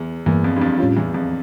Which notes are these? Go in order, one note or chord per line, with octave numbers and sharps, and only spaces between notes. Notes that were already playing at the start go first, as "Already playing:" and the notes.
Already playing: E2
E2 G2 E3 A#3
F2
G2
F2
A2 G3 C#4 F4
E2
F2